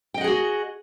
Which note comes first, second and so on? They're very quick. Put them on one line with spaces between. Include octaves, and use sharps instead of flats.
G5 D#5 F#5 G#4 F#4